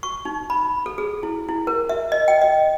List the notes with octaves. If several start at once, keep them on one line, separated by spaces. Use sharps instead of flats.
C#6
D#4
B5
A4
G#4
E4
E4
A#4
E5
D#5
G5
D#5